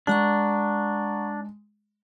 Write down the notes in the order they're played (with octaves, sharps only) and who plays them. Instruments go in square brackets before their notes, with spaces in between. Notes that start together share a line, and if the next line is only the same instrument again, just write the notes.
[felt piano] G#3 [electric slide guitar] D4 [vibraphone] F#5 A#5 C#6